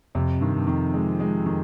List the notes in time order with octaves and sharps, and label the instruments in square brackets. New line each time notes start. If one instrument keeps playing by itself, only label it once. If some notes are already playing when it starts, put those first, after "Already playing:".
[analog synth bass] F2 [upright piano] C3
[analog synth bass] G2 [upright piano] D#3
[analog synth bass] G2
[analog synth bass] F2 [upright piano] D#3
[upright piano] G#3
G#3
D#3